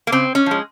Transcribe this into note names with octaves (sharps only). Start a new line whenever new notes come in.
A#3
C#3 C4
C#4
F3 G#3